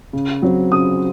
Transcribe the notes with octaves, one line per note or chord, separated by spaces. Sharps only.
C#3
F#3 C4
C#3 D#6